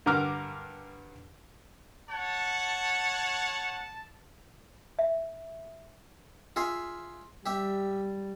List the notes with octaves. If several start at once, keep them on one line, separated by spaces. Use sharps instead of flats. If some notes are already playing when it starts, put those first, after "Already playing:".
G2 D3 A#4 D6 F6
C#5 F#5 A5
E5
F4 G#4 E5
G3 G4 E5